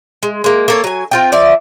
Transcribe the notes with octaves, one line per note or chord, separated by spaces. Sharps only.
G#3
G#3 A#3
A#3 A4 C#5
F#3 G#5
C4 F4 G5
F3 D5 E5